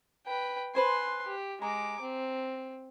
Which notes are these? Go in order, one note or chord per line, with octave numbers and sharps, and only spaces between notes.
B4 G5
B4 C5 G#5 C6
G4
G#3 A#5 D6
C4